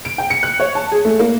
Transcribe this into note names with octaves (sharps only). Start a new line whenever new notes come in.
D7
G5
C#7
F#6
C#5
A5
G#4
A3
A#3